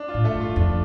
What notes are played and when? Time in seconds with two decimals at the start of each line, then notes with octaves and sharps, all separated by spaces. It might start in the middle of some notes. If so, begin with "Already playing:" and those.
Already playing: D4
0.08 F4
0.14 A2
0.24 A3 A4
0.35 G2
0.40 F4
0.56 F2 D4